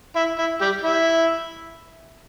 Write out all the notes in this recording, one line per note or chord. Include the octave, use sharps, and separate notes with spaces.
E4
E4
G3 G4
E4